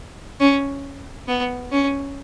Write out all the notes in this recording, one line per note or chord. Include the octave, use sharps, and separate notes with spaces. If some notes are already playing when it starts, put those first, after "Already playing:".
C#4
B3
C#4